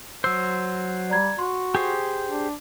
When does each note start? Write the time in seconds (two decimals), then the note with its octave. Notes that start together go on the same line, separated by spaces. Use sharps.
0.24 F#3 C5 E6
1.10 G3 D5 A#5 G#6
1.39 F#4 C6
1.75 G4 G#4 C5
2.28 D4